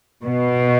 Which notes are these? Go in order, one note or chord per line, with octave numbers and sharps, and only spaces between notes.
B2